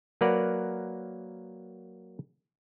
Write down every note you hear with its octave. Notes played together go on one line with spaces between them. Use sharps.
F#3 A#3 A#4 B4 D5 F#5